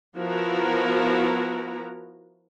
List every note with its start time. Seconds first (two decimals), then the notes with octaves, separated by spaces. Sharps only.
0.17 F3 B3 E4 F#4 A#4 A#5